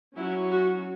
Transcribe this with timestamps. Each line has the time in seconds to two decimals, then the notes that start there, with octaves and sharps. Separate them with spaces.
0.16 F#3 C#4 E4
0.49 F#4